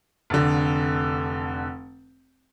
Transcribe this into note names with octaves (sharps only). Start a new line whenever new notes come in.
F1 D3